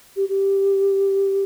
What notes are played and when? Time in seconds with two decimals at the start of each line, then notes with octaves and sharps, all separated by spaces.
0.16 G4
0.29 G4